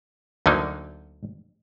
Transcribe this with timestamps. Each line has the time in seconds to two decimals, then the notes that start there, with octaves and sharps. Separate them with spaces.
0.46 D2 D3 F#3 A#3 D#4